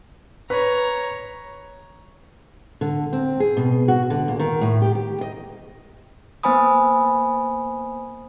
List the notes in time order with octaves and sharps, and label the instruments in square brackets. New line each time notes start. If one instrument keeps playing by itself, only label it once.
[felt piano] B4 [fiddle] C#5 A#5
[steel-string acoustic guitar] D3
C4
G#4
B2
F#4
D3
A#2
D#3
A2
G4
G4
D#5
[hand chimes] A#3 B3 C5 G#5 B5 D#6